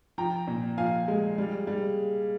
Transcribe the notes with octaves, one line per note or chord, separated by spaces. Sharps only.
F3 G5 A#5
A#2
F3 F5 G#5
G#3
G3
G3